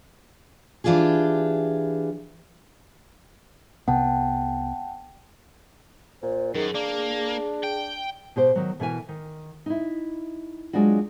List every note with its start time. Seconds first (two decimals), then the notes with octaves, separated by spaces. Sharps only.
0.84 E3 D4 F4 G4 G#4
3.88 C2 C3 B3 F#5 G5 A5
6.23 A#2 C5
6.55 F#2 D#3 G#4
6.75 A#3 D4
7.63 G5
8.36 B2 G4 C5
8.56 D#3 F#3
8.80 B2 E3 A#4 G#5
9.09 D#3
9.66 D#4 E4
10.73 F#3 G#3 D4 F4 F#4